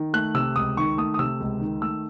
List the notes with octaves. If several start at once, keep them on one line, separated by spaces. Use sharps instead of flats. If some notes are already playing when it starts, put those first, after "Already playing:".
Already playing: D#3
A3 F#6
C3 E6
C#2 D#6
D#3 C#6
A3 D#6
D#6
C3 E6
C#2
D#3
A3 E6